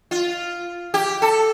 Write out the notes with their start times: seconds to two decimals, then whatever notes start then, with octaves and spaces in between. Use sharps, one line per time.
0.11 F4
0.94 G4
1.22 A4